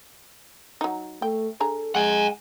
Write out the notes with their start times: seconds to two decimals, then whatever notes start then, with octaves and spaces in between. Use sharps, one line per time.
0.81 F#3 D#4
1.22 A3 G5
1.60 D4 G#4 A4 A#5
1.95 G#3 F#5 G#5